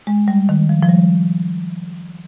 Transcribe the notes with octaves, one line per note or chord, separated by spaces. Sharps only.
G#3
G3
D#3
F3
F3
G3